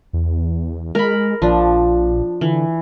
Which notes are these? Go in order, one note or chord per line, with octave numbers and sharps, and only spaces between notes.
E2
G#3 A#4 B5
A#1 F3 D4
D3 E3